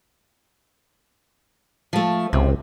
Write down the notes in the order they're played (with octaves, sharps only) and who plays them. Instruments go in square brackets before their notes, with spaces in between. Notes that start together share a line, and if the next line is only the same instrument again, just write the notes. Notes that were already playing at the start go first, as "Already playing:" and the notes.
[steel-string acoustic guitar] F3 A3
[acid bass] C#2 [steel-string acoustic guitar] C3